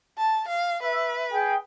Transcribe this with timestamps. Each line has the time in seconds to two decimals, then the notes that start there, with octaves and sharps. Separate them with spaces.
0.18 A5
0.48 F5
0.83 B4 E5
1.32 G#4 G5